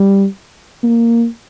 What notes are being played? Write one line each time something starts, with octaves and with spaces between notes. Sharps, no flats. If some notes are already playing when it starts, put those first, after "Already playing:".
Already playing: G3
A#3